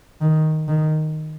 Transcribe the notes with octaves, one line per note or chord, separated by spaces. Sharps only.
D#3
D#3